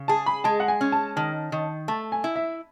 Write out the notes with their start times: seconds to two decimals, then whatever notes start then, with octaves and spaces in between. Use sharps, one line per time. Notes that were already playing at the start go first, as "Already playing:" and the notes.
Already playing: C#3
0.08 G#4 A5
0.26 B5
0.44 G#3 A5
0.60 F#5
0.68 G#5
0.81 C#4
0.92 A5
1.16 D#3 A5
1.52 D#3
1.88 A3 A5
2.12 G#5
2.24 E4
2.36 E5